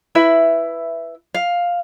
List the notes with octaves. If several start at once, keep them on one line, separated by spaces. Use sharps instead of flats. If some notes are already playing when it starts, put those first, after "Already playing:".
E4 B4 E5
F5